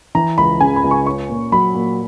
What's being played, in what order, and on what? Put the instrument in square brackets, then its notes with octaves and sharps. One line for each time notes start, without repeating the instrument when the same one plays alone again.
[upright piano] E3 [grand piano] A#5
[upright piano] C#2 [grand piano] B5
[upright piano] C#3 [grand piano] G#5
[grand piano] B5
[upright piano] C#2
[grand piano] C#6
[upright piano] C#4 [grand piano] C#6
[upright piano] A#2
[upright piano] F#3 [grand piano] B5
[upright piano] A#2